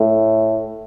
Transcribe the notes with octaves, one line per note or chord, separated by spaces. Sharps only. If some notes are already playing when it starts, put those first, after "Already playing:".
Already playing: A2